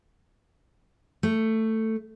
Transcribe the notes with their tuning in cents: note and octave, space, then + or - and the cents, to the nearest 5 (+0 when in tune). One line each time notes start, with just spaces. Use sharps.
A3 +10